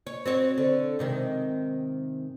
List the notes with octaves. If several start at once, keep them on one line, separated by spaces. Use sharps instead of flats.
C#5
C4 F#4 C#5
D3
G#2 C3 D#3